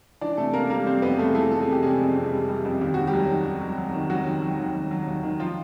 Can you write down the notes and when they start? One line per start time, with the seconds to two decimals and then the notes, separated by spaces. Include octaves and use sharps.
0.21 E3 D4 D5
0.37 C3 A3 A4
0.54 C3 A#3 A#4
0.70 G3 A#3 A#4
0.86 G3 C4 C5
1.02 F2 B3 B4
1.18 C3 A3 A4
1.31 G#4
1.35 E3 A3 A4
1.52 E3 A4
1.61 G#4
1.67 C3
1.72 G4
1.83 C3 G#3 G#4
2.00 F2
2.16 F2
2.32 G3
2.49 G3
2.65 F2
2.81 D#2 G4
2.94 D#2 F#4
3.07 G3 G4
3.13 F#3
3.29 D#3
3.45 D#3
3.61 F#3
3.78 F#3
3.94 D#3
4.10 F#3 F#4
4.27 D#3
4.42 F#3
4.59 D#2
4.75 F#3
4.91 F#3
5.08 D#2
5.23 D#3
5.39 F3 F4